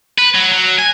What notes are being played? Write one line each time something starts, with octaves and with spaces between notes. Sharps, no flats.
B4
F#3
F#3
G#5